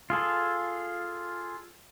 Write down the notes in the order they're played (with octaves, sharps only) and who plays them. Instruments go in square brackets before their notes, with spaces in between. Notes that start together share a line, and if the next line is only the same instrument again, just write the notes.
[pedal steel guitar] F4 G#4 A4